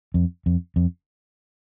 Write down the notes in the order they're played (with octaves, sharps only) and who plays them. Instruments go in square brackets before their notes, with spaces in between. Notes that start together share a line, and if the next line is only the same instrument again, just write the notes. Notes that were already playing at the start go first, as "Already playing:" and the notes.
[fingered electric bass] F2
F2
F2